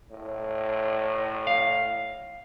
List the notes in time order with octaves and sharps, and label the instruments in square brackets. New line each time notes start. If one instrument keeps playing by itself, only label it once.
[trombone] A2
[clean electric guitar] F5